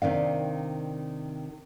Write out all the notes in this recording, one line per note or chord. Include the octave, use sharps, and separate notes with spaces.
C3 D#3 D4 F5